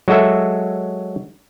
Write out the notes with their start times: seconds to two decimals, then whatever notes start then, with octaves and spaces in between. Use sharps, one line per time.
0.08 F#3 G#3 F#4 A4 E5